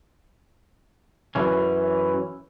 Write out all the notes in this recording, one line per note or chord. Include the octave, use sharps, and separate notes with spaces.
F#2 E3 C#4